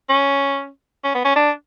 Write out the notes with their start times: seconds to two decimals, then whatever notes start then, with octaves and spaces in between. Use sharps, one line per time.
0.10 C#4
1.04 C#4
1.15 B3
1.25 C#4
1.36 D4